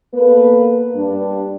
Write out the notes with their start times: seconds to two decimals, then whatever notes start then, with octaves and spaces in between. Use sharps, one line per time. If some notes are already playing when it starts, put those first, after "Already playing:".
0.14 A#3 B3 A4 B4
0.95 G2 D4